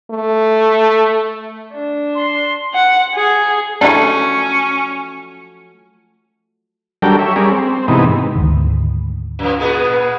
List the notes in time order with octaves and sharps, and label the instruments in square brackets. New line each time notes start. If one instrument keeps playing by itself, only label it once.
[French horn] A3
[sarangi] D4
[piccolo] C6
[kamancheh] F#5
G#4
[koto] F3 F#3 A3 [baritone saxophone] C#4 [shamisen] D4 E4
[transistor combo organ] F#3 G3 D4 A4 A#4 G5
C#5 E5
G3 C#4 G#4 A#4 D5
C4
G#2 C3 E3 B3 D#4
[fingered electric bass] D2 G#2 D#3
[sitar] F#2 F3
A#2 B3 G#4